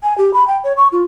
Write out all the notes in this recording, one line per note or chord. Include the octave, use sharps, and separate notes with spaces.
G#5
G4
B5
G5
C#5
C#6
F4